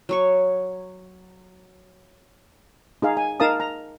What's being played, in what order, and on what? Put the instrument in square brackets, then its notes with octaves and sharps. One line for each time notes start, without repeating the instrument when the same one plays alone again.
[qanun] F#3 C#5 C#6
[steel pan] D#4 G#4 F5
G#5
D#4 A#4 F5 A5 D#6
A#5